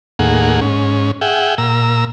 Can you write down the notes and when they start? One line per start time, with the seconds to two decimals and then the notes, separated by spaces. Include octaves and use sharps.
0.19 D#2 A2 A#3 G#4 F#5
0.61 G#2 C#4
1.21 G#4 E5 F#5 G5
1.58 A#2 A#5 E6